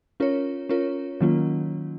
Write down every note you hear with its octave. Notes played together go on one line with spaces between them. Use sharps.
C#4 F4 A#4 C#5
C#4 F4 A#4 C#5
D#3 F#3 A#3 C#4 F4